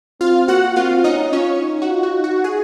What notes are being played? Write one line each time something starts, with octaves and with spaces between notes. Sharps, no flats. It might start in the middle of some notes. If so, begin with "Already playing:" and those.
C4 F4 F5
A#3 F#4 F#5
C4 F4 F5
C#4 D#4 D#5
C#4 F4 C#5
D#4
F#4
F4
F#4
D#4
F#4
G#4